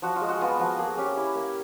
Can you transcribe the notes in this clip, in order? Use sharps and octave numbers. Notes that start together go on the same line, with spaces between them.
F3 F#4
F4
G#3
F#4
B3 F4
F3 F#4
A#3 G#4
C#4 G4
E4
A#3